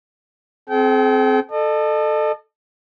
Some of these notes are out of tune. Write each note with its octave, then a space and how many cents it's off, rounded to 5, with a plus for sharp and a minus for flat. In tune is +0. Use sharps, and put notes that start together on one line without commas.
C4 +0 G#4 +45 G5 -30
A4 +0 D#5 -45